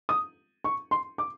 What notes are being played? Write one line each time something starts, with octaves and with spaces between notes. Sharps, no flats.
D#6
C#6
C6
D6